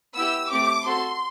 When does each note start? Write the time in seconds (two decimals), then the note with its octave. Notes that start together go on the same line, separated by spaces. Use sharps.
0.15 B3 E4 G4 E6
0.50 A3 C4 G4 D6
0.86 C4 F#4 A4 C6